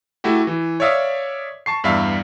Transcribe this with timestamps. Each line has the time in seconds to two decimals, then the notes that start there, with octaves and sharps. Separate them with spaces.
0.24 A3 E4 F#4 G4
0.47 E3
0.80 C#5 D5 E5 F5 D#6
1.66 A5 C#6 C7
1.84 E2 G2 G3 E5 F5 F6